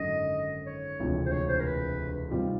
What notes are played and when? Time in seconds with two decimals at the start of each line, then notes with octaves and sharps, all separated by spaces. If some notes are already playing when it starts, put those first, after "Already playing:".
Already playing: G#1 F#2 D3 D#5
0.66 C#5
0.99 E1 D2 C3 F3
1.26 C5
1.32 C#5
1.48 C5
1.60 A#4
1.65 B4
2.31 C3 D#3 G3 C4 F4